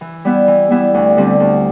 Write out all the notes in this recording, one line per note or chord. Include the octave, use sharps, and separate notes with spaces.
E3
G3 B3 E4
E3
G3 B3 E4
D2
D3 G3 C4
D2